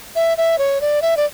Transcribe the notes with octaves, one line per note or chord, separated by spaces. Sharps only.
E5
E5
C#5
D5
E5
D5